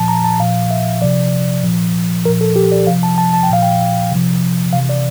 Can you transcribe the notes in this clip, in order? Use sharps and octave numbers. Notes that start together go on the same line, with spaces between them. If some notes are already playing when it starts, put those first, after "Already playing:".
Already playing: A#2 F3 A5
A#5
A5
A#2 F3 F5
E5
C3 F3 D5
A#2 F3
A#2 F3 A#4
A4
G4
D5
C3 F3 F5
A5
A5
A5
G5
A#2 F3 F5
G5
C3 F3
C3 E3 F5
D5